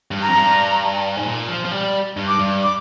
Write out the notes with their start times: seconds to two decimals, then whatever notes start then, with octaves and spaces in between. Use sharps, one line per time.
0.11 G2
0.22 A#5
0.29 F2
0.35 G2
1.17 G#2
1.25 A#2
1.48 F3
1.65 F3
1.72 G3
2.17 G2
2.28 D6
2.39 G2
2.63 D6